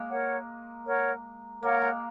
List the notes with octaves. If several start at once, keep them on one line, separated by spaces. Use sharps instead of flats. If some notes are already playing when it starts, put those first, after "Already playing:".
Already playing: G#3 A#3
A#4 C#5 F#5
A#4 C#5 F#5
A#3 A#4 C#5 F#5
G#3